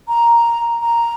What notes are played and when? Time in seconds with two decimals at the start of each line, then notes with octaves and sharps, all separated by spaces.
0.08 A#5
0.81 A#5